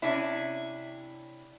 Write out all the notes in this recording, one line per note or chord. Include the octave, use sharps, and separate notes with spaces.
C3 C#4 D4 E4